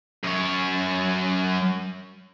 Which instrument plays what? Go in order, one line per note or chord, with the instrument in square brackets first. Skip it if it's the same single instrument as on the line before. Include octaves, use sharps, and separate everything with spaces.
[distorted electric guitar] F#2 C#5